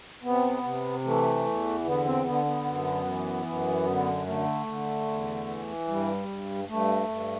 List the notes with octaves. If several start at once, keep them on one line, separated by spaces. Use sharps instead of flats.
C3 B3
C3
E3 A3
E2
D3 B3
C4
D3 B3
B3
F#2
E3
F#2
D3
D3 A3
D3
E2
E3
G2 G3
G2
G2 A3
G2